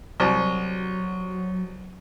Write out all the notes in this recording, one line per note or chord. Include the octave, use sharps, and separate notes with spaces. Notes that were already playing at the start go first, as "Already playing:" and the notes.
C2 F#3